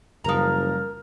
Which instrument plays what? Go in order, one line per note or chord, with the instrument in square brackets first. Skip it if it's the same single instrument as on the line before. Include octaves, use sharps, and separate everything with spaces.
[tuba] F#1 [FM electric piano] F#2 C#3 G3 [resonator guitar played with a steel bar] F3 A#5 [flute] A#4